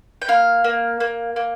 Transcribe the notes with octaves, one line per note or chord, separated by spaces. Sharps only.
G5
A#3 F5
A#3
A#3
A#3